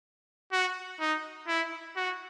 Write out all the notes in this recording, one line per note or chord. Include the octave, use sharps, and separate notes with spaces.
F#4
D#4
E4
F#4